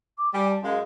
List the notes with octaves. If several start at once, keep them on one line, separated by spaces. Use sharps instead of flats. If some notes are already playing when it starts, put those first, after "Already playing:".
D6
G3 G#5
A5
F#2 G#3 F5